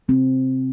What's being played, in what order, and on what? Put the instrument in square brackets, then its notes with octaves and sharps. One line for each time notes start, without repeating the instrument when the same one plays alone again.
[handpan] C3 C4